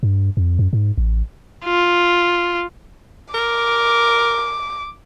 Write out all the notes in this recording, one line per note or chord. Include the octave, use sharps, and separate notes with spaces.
G2
F2
F#2
G#2
A1
F4
A#4 D6